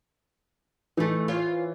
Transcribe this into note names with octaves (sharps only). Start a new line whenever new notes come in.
E3 A3 D#4
F4 C5 C#5